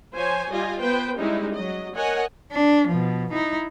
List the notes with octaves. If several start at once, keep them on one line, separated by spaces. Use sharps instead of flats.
F3 C5 C#5 G#5
G3 F4 G4 D#5 G#5
B3 B4 C5 G5
G3 G#3 C#4 D#4 E4
F#3 D#5
A#4 C#5 D#5 F#5 G#5
D4
B2 F3
D#4 E4